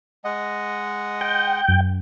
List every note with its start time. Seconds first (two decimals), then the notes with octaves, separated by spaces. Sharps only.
0.25 G#3 D#5 F#5
1.21 G5
1.68 F#2